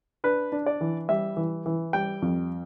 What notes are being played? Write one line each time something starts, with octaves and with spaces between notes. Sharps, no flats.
D4 B4
D4
D5
E3
G3 E5
E3
E3
G3 G5
F2